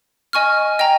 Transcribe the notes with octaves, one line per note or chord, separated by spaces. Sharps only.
D#5 G#5 C#6 F6
D#5 G5 A#5